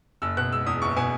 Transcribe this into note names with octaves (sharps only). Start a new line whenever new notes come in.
F#1 E6
B2 F#6
G#3 E6
E2 D#6
F#1 C#6
B2 G#5